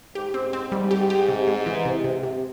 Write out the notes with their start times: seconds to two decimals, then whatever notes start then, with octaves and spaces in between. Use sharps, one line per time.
0.15 G#2 G4
0.34 C4
0.53 C4
0.72 G#2 G3
0.91 G4
1.10 G4
1.28 C3
1.47 G#3
1.67 E3
1.85 C3
2.04 C3
2.23 C3